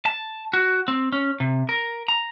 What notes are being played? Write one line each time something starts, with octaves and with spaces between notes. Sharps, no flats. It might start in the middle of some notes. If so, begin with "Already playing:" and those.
A5
F#4
C4
C#4
C3
A#4
A#5